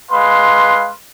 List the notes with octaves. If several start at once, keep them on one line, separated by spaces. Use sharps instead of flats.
G#3 B4 F5 C6